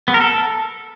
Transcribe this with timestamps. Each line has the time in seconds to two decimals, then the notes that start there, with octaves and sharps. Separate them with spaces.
0.08 B3
0.14 A#4
0.21 A4